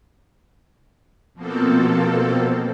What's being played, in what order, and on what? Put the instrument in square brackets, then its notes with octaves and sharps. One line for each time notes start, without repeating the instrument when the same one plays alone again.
[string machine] B2 F3 A#3 C4 A4